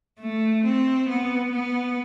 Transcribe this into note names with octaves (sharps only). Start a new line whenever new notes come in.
A3
C4
B3
B3